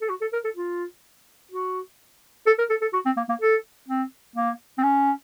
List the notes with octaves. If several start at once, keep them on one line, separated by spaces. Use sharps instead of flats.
A4
F#4
A4
A#4
A4
F4
F#4
A4
A#4
A4
A4
F#4
C4
A#3
A#3
A4
C4
A#3
C4
C#4